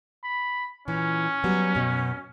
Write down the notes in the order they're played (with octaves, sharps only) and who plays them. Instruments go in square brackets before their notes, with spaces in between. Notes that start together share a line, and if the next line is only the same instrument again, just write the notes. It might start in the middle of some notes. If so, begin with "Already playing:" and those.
[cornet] B5
[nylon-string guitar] A#2 E3 [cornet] C#4
[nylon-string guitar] F#3 G3 B3
F#2 B2